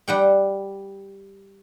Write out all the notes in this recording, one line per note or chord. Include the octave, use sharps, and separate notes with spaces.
G3 F#5 G5